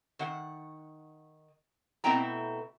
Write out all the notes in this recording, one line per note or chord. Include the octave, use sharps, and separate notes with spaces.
D#3 F#5
B2 A3 C4 E4 G5 A#5